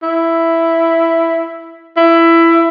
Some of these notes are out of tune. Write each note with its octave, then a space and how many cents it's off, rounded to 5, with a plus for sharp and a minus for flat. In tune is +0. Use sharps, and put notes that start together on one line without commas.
E4 +5
E4 +15